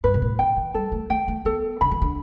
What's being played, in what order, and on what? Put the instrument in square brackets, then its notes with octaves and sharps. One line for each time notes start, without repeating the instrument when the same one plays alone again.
[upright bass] G2 [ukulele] B4
[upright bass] B2
A2
[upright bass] D3 [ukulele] G5
[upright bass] E3
[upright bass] G3 [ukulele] A4
[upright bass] A3
[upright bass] A3 [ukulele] G5
[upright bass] A3
[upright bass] B3 [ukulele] A4
[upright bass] D3 [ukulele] B5
[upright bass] E3
D3